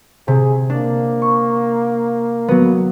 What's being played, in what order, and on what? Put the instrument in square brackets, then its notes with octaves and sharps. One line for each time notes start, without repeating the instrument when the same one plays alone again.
[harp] C3 [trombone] G#4
[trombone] A#3 [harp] D4
[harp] C#6
F#3 B3